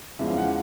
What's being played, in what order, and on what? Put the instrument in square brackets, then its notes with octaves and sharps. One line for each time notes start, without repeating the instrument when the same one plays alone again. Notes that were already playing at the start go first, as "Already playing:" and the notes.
[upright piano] E2 C#3 F3 G#3 E5
F5
F#5